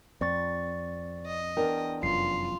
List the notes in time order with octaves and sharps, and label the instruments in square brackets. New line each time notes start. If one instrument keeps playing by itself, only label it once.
[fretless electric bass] F2 [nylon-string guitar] C4 [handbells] D5 C#6 A6
[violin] D#5
[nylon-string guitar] E2 D4 A#4 [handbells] G5
[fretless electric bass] F1 F#2 [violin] F4 [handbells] C7